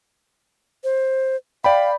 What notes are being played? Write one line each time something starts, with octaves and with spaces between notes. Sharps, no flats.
C5
D5 F5 G5 B5